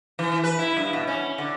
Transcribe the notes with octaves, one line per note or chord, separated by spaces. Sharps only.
E3
B4
E4
G2
B2
C#4
D3